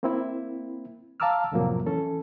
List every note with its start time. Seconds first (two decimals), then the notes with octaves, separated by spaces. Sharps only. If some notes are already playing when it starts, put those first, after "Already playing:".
0.03 A#3 C4 E4
1.20 F5 A5 A#5 D6 E6 F6
1.52 F2 A2 C3 F3 F#3 A#3
1.87 E3 C#4 A4